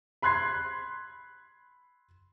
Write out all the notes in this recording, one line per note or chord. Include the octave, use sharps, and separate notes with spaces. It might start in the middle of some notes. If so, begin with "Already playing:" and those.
B5 C6 F#6 G#6 C7